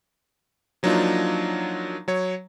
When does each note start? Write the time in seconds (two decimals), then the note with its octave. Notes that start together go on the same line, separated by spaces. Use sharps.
0.83 F3 F#3 A#3 D4 D#4 F4
2.08 F#3 C#5